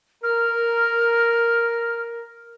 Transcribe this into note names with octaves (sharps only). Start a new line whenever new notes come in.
A#4 F6